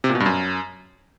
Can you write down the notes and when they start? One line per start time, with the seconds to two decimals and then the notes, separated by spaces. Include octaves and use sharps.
0.04 C3
0.09 A#2
0.15 B2
0.20 G2
0.26 F#2